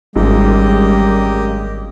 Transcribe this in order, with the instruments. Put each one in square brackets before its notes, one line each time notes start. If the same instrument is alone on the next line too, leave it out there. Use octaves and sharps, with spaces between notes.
[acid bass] G#1 [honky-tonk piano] F#2 G#3 [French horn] G3 [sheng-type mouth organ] A#3 G4 D#5